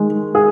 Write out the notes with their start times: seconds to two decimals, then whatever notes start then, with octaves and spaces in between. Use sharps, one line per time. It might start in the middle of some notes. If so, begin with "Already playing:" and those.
Already playing: D#3 G#3
0.35 G#4